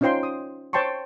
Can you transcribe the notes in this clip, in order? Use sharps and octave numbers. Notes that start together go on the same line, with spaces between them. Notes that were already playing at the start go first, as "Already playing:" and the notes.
C#4 D#4 F4 C5 G5 C6
D#6
C5 C#5 G5 A5 C6 C#6